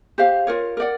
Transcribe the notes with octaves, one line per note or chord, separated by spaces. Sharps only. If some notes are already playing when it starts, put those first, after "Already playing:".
G4 C5 F5
F4 A#4 C#5
A#4 D5 F#5